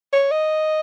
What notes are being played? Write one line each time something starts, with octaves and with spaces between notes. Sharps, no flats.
C#5
D#5